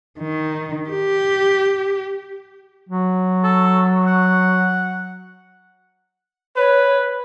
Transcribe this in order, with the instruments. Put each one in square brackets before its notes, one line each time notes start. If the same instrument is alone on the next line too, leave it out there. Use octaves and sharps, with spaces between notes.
[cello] D#3
G4
[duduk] F#3
[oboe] A4
F#5
[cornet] B4 [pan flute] C#5